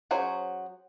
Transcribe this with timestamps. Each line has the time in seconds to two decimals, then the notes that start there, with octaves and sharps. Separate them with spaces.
0.11 F#3 C#4 F#4 G#4 C5